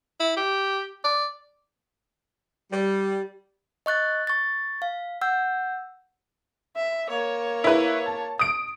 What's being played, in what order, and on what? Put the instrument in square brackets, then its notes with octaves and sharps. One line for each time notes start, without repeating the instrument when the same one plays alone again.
[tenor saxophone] E4
G4
D5
[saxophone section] G3
[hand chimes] D#5 C#6 F#6 A6
C#6 A6
F5
F#5 E6 G6
[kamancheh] E5
A#3 C#5
[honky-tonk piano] E4 B4
A5
D#6 D7